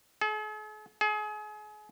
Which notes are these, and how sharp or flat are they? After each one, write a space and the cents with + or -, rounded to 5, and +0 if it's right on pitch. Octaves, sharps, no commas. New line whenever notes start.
G#4 +45
G#4 +30